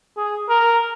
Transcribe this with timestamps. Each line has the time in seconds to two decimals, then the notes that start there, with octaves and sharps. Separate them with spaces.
0.17 G#4
0.49 A#4